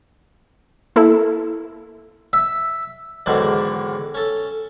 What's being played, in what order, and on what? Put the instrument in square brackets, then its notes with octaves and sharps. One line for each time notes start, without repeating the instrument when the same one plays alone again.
[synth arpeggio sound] A#3 E4 A4
[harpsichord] E5
E2 G#2 D3 D#3 F#3
C#4 A4